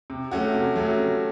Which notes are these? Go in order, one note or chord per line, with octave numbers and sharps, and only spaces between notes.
C3
F#3 A3 C#4 F#4
C3
F#3 A3 C#4 F#4
C3